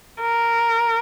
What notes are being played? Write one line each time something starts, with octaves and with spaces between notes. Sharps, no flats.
A#4